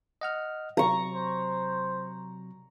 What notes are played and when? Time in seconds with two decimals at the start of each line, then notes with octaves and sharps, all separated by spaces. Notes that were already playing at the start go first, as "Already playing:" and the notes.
0.21 D#5 F#5 F6
0.77 C3 F#3 A#5 C#6
1.13 C5